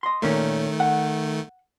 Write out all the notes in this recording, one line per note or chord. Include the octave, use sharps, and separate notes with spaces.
D#5 C6
A#2 D#3 A3 A#3 C#4
F#5